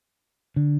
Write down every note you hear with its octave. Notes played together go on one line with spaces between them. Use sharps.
D3